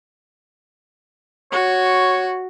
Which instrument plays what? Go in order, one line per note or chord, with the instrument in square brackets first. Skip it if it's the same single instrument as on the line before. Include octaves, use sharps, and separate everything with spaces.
[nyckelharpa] F#4 [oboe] C#5